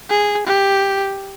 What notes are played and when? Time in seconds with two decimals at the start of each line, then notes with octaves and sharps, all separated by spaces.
0.09 G#4
0.47 G4